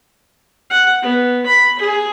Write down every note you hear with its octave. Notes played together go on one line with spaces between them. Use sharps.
F#5
B3
B5
G#4